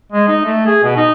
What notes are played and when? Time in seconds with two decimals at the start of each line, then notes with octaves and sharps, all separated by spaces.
0.12 G#3
0.28 D#4
0.45 A3
0.66 G#4
0.83 B2
0.96 D#4